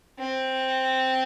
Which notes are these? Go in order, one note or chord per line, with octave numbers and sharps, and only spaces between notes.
C4